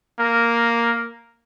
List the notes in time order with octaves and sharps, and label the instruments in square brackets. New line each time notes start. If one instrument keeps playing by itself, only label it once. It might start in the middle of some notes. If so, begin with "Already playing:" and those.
[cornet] A#3